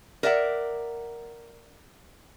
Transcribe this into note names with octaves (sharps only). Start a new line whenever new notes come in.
A#4 D5 E5 F#5